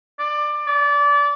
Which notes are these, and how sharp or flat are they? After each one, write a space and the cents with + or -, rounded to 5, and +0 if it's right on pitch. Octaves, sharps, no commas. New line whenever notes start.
D5 +20
D5 -25